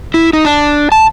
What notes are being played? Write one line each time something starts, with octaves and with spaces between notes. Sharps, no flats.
E4
D#4
D4
A5